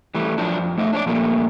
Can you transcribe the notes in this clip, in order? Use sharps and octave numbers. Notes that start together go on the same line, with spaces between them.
E3 G3 A3
F3 F#3 D4
F2
A3 D#4 D#5 E5
D4 C#5 D5
A#2 F3 G3 A3 A#3